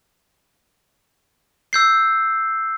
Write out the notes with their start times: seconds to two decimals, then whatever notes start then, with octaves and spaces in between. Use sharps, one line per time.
1.73 E6 G6 C7